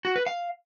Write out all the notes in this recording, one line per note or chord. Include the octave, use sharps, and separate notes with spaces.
F#4
B4
F5